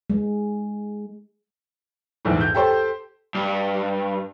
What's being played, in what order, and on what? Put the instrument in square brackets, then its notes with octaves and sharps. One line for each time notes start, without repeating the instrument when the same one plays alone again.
[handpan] G#3
[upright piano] A#1 E2 G#2
G6
G4 A4 C5
[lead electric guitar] G2